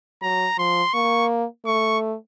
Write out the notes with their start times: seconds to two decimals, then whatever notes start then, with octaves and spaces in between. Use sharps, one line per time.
0.22 F#3 A#5
0.57 F3 C6
0.93 A#3 C#6
1.65 A3 C#6